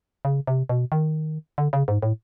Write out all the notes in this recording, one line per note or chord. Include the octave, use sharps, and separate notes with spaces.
C#3
C3
B2
D#3
D3
C#3
G#2
A2